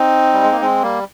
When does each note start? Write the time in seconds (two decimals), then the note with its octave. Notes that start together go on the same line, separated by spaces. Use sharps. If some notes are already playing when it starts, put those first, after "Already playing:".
Already playing: C4 D#4
0.33 G3
0.42 G#3
0.52 A#3
0.61 G#3 C4
0.82 G3 A#3